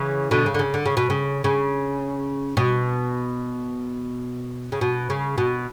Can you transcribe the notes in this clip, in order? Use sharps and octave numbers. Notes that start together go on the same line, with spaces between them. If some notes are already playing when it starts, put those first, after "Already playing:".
Already playing: C#3 E3
B2 D3
C#3
D3
C#3
D3
C#3
B2
C#3
C#3
B2
C#3
B2
C#3
B2